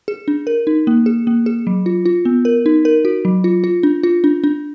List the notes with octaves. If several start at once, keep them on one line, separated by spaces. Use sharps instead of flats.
G#4
D4
A#4
D#4
A#3
G#4
A#3
G#4
F#3
F4
F4
B3
A#4
D#4
A#4
F#4
F#3
F4
F4
D4
F4
D4
D4